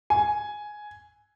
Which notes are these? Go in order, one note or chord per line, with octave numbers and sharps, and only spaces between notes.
G#5